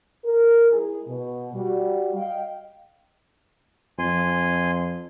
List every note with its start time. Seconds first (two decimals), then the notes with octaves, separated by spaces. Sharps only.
0.24 A#4
0.71 G#3 E4 G#4
1.08 B2
1.54 G3 F#4
2.16 D#5 F5 G5
3.99 F2 G#5 C6